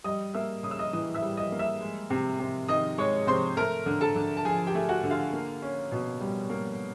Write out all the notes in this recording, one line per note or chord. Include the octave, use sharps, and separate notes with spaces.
G3 D#5 D#6
A#3 E5 E6
C#3 D#6
E6
D#5 D#6
E3 D#5 D#6
E5 E6
G3
D#5 D#6
A#3
E5 E6
G#3
C3
C3
D#3 D#5 D#6
G#3 C#5 C#6
C3 C5 C6
A3 A#4 A#5
D3
A4 A5
D3
A5
F3 G#4 G#5
G4 G5
A3
F#4 F#5
D3
F4 F5
A#3
C#4
B2
G3
A#3